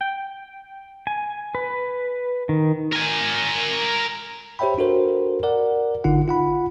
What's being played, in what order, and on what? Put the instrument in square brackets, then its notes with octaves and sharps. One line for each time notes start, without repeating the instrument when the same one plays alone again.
[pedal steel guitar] G5
G#5
B4
D#3
[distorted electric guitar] A#4 G#5
[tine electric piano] G4 C5 C#5 E5 G5 B5
D4 F#4 A4 A#4 C5
A#4 D5 F#5
G#1 D3 D#4 F4 F#5
F4 F#5 B5